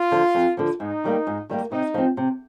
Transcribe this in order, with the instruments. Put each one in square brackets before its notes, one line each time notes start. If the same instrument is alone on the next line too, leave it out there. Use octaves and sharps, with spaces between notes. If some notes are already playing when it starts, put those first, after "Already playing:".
Already playing: [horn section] F4
[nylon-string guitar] D3 F3
F2
D3 F3
[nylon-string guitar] G#2 [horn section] D#4
[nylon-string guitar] D#3 G3 A#3
G#2
D#3 G3 A#3
[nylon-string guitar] C3 [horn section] D#4
[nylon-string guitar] F3 C4
C3